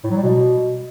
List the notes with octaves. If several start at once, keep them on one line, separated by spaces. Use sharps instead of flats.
A2
F#3
G3
B2